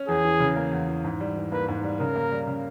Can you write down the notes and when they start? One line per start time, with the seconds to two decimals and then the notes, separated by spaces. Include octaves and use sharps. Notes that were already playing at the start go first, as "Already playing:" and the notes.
Already playing: C#4
0.08 E2 G#4
0.24 E3
0.40 C#3
0.56 A#3
0.72 E2
0.88 E3
1.04 G#2
1.20 G3
1.36 E3
1.52 A#3 B4
1.68 G#2
1.84 G3
1.99 C#3 A#4
2.16 A#3
2.32 G3
2.47 C#3